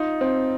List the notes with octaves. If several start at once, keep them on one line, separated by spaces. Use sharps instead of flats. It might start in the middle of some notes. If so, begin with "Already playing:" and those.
Already playing: D#4 F4
C4